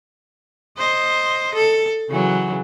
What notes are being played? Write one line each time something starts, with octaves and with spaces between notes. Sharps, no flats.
C5 D#5
A4
C#3 E3 F#3